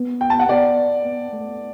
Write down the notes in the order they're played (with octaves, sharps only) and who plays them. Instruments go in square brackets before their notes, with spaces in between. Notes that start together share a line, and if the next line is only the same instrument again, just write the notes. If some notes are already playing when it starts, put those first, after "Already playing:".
Already playing: [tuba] B3
[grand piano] G5
A5
F#5
[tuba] B3 [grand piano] D5
[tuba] B3
A3